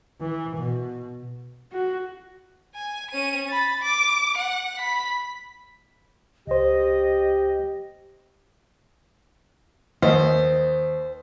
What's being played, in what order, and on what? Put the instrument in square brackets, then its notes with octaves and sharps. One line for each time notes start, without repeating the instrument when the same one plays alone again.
[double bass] E3
B2
[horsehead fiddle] F#4
[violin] G#5
C#4 D#7
B5 A6
D6
F#5
B5 B6
[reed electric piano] C#2 C5 [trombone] G4 [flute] D#5
[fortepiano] D#2 D#5 [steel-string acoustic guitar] C5